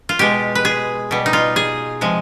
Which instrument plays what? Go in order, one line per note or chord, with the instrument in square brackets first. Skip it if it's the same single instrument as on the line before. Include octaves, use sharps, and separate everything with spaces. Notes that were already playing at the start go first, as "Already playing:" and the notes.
[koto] F4
B2 G#3 G4
B4
G#4
B2 G3
D#4
F4
G#4
C3 F3 G#3